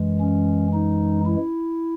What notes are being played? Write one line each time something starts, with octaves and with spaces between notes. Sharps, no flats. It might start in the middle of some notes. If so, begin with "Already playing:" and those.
Already playing: F#2 E3 G#3
C#4
D#4
E4